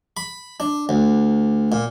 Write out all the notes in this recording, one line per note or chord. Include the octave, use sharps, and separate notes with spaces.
B5
D4
D2
A#2